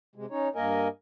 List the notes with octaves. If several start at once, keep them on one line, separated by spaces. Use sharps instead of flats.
C3 G#3
C#4 D#4 C#5
G2 A#3 A#4 D#5 G#5